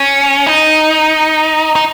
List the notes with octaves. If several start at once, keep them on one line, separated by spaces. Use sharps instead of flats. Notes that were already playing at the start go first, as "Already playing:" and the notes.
Already playing: C#4
D#4
D#4